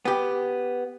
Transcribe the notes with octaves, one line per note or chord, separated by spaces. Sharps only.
B3 G4